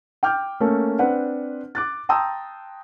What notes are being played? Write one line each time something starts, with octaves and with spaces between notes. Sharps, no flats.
G5 D6 F6 G6
A3 A#3 C#4 A4
C4 D4 B4 F#5
D6 F#6 A6
G5 A5 A#5 C6 D#6 E6